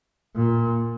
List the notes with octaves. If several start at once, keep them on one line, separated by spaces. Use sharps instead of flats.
A#2